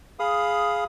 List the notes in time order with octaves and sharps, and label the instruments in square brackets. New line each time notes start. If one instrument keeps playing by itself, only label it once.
[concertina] G#4 F5 B5 D#6